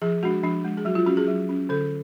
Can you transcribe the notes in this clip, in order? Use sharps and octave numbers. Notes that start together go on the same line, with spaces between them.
F3 G#4
G#3 D4 F#4
F3 D4
G#3 D4
G#4
F#3 F#4
F4
C#4 F#4
G#4
F#3
C#4
D3 A4